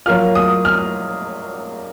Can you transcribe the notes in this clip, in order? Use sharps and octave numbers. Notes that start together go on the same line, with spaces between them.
F#3 A#3 F4 F6
D#6
F6